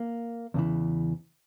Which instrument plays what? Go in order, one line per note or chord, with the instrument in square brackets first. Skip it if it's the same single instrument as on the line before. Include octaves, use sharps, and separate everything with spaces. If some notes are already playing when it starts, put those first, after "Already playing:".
Already playing: [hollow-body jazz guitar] A#3
E2 C#3 E3